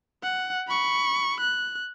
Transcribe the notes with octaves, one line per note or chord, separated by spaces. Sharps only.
F#5
B5 C#6
F#6